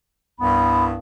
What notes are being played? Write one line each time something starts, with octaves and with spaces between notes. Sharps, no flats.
C2 G2 B3 B5